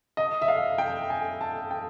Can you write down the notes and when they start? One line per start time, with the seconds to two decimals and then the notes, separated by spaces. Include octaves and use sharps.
0.17 D#5
0.42 E5
0.48 F5
0.78 G5
1.10 G#5
1.41 A5
1.71 G5